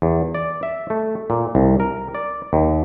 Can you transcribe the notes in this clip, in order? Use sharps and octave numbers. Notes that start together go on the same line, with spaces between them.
E2
D5
E5
A3
A#2
C2
A#4
D5
D#2